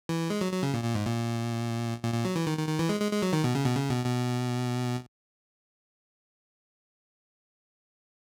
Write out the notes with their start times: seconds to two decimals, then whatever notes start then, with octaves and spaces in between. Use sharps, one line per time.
0.09 E3
0.30 G#3
0.41 F#3
0.52 F#3
0.63 C#3
0.74 A#2
0.84 A#2
0.95 G#2
1.06 A#2
2.04 A#2
2.14 A#2
2.25 F#3
2.36 E3
2.47 D#3
2.57 D#3
2.68 D#3
2.79 E3
2.89 G#3
3.01 G#3
3.11 G#3
3.22 F#3
3.33 D#3
3.44 B2
3.55 C#3
3.65 B2
3.77 C#3
3.91 B2
4.05 B2